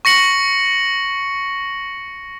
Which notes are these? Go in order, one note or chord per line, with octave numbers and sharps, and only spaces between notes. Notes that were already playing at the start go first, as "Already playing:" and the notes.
C#6 A#6 C#7 F#7